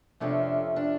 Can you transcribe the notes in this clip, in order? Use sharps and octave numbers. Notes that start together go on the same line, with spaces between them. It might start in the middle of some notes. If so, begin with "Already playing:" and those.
F2 C3 F3 A3 C#4 D4
D4